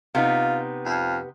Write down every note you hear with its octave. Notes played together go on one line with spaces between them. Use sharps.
C3 B3 D#4 F4
F2